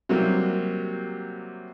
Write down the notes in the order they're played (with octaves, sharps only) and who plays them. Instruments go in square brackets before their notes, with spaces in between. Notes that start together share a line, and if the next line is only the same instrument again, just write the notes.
[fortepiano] C3 F#3 G3 A#3